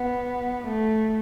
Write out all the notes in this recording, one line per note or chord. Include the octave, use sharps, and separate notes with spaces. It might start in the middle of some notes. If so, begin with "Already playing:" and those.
Already playing: B3
A3